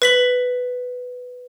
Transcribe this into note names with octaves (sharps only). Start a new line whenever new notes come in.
B4 B6 F#7